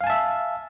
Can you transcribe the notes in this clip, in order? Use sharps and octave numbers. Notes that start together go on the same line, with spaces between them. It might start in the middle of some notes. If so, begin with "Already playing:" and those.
E5 F5 G#5 A5